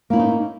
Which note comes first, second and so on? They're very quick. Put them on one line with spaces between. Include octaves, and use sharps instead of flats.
A#3 E4 C#4 D#4